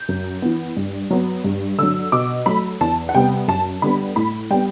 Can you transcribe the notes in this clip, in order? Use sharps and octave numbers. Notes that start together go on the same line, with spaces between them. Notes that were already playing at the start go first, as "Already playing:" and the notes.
Already playing: G6
F#2
E3 B3
G2
F#3 B3
G2
D3 F#3 E6
B2 D6
F#3 A3 B5
E2 A5
F#5
C3 G3 B3 G5
F#2 A5
D3 G3 B3 B5
A2 B5
G3 B3 G5